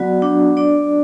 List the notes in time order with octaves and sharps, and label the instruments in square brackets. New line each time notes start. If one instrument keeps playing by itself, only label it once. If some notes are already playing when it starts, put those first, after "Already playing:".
Already playing: [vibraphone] F#3 B3 F#4 D5
D4
D4 D5